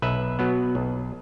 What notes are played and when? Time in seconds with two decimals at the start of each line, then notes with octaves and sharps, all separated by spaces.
0.02 B1 B4 E5
0.39 B2 F#3 B3
0.75 B1